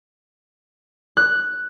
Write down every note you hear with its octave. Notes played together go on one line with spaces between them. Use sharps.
F#6